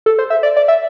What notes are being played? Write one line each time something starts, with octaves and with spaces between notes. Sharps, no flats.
A4
C5
E5
D5
D5
E5